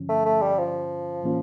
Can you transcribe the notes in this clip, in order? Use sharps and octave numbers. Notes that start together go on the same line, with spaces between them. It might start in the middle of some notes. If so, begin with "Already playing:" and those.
Already playing: G2 D3 F3 C#4
A3
A3
G3
F3
A2 E3 A#3 C#4 F4